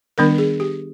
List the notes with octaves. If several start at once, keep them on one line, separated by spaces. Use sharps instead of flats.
D#3 G3 B3 D4 A#4
G#4
G4